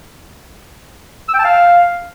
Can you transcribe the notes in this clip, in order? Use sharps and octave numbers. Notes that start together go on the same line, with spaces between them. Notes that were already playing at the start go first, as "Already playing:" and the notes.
E6
G5
A5
F5